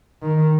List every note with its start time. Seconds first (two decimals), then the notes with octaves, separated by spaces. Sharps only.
0.22 D#3